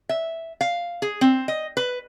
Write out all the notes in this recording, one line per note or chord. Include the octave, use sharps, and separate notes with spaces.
E5
F5
G#4
C4
D#5
B4